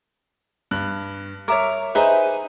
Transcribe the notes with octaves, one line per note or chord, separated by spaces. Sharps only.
G2 F#6
A#4 C#5 E5 D6
D#4 G#4 B4 C5 E5